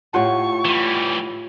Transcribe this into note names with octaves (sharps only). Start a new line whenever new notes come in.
A2 F4 G4 C#5 F#5 C#6
E3 G3